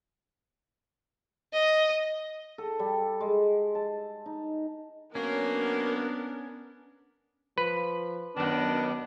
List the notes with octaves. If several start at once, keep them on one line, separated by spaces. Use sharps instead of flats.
D#5
A4
G3
G#3
A5
D#4
F#3 A#3 B3 C#4 D4 A#4
F3 B4
F#2 D#3 B3 D4